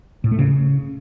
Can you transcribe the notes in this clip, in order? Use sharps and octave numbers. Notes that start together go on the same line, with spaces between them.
A2
A3
C#3